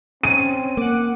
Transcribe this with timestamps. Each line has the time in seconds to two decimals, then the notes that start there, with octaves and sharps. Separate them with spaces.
0.23 C4 C#4 D#7
0.77 A#3 F#5 D6